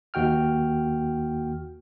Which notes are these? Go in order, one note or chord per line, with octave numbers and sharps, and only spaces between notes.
D#2 F#4 G5 F6